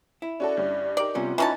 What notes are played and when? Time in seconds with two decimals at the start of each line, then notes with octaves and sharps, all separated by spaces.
0.22 E4
0.40 C#4 F#4 A4 D5
0.57 G2 C#4 G4
0.97 D#4 G4 A#4 D5
1.15 C3 G3 B3 C#4 F4
1.38 E3 B3 C#4 D#4 A5 B5 C#6